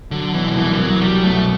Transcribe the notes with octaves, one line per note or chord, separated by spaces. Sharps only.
D3 F#3
B2 E3
D3
C2 E3
G3
C2 F#3
F#3 G3
B2 A3